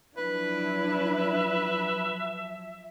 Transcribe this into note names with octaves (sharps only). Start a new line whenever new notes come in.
F3 F#3 D4 E4 B4
E5